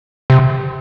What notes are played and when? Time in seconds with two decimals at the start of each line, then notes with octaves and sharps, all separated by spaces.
0.30 C3